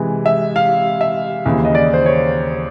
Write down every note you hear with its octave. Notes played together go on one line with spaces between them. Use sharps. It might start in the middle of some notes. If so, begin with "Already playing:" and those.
Already playing: C3 E3 G#3
E5
F5
E5
D#2 C#3 E3
D#5
D5
C5
C#5